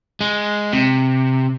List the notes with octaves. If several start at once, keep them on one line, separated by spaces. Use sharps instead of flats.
G#3
C3